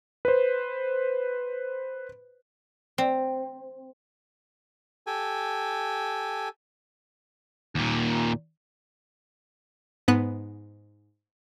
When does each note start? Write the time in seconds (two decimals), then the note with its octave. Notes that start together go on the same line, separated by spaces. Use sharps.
0.25 B4 C5
2.98 C4
5.07 G4 A4 G#5
7.75 D#2 A#2
10.08 G#2 B3 F#6